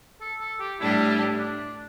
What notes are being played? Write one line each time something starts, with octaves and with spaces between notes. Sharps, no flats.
A4
A4
G4
A2 G3 D4 E4 G4
D4